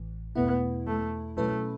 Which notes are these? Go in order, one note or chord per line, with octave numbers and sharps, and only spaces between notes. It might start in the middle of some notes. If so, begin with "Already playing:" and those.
Already playing: A1 A2 E3
E2 B2 A3 B3 E4
A3
B2 F#3 A3 C#4 E4 B4